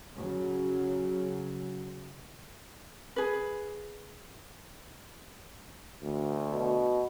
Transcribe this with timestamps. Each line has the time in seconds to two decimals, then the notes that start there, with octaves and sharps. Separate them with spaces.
0.17 C#3 F#3
3.16 G#4 B4
6.03 D2
6.51 B2